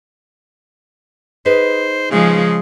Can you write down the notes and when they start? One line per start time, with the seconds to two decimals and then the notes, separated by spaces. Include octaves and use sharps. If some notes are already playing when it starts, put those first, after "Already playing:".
1.45 D#4 G#4 B4 C5
2.11 C#3 F3 G#3